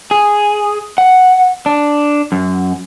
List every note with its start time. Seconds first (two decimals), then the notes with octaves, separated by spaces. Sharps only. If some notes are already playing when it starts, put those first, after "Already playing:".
0.11 G#4
0.98 F#5
1.66 D4
2.32 F#2